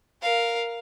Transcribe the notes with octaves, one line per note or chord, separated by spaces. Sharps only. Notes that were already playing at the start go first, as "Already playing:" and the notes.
A#4 F5